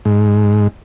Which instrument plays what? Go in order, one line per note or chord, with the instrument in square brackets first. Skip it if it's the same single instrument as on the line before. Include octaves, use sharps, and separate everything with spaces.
[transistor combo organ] G#2